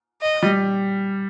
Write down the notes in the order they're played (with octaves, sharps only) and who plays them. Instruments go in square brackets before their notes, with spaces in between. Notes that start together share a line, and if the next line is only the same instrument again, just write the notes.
[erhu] D#5
[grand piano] G3